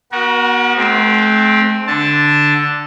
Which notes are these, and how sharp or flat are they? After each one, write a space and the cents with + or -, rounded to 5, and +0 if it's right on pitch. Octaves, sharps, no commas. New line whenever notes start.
B3 -35 F#4 +10 A#4 +35
A3 -45 C4 +0
D3 +0 A5 +0